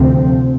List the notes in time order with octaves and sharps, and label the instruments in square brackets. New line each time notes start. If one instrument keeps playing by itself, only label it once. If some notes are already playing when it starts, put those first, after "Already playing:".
Already playing: [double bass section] D2 C3 F3 C4